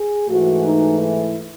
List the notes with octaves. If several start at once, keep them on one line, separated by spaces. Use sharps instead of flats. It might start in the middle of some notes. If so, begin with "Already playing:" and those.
Already playing: G#4
G#2 E3 A3 F#4
D#4
E4